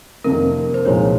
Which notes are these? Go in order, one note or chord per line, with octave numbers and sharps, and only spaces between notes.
F2 C3 D#3 A#3 A#4
C5
C2 A#2 F3 G#3 D#4 C#5